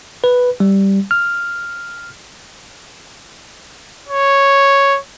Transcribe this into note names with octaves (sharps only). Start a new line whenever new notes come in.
B4
G3
F6
C#5